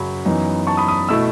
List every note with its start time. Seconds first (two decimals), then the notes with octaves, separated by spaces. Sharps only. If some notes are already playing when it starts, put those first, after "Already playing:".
Already playing: F#2 C#3 F#3 B5
0.25 F#2 E3 B3 D#4
0.67 A5 C#6
0.77 B5 D#6
0.88 B5 D#6
1.09 B2 A3 E4 E6